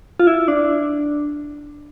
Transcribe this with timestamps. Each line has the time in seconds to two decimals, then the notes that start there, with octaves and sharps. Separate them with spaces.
0.20 F4
0.27 E4
0.48 D4